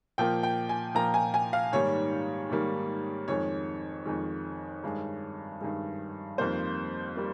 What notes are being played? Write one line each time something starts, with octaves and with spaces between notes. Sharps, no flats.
A#2 F3 A#3 G5
G5
G#5
A#2 F3 A#3 A#5
G#5
G#5
F5
G#2 D#3 G3 A#3 C#5
G#2 D#3 G3 A#3
F2 D#3 G#3 C#5
F2 D#3 G#3
G2 D#3 G#3
G2 D#3 G#3
F2 D#3 G3 A#3 C5
G3 A#3